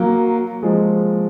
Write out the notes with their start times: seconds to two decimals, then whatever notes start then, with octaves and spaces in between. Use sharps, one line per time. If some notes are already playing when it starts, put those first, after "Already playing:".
Already playing: F#3 A#3
0.63 F3 G#3